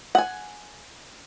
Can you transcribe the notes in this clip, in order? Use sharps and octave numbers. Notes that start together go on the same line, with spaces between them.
F#5 G#5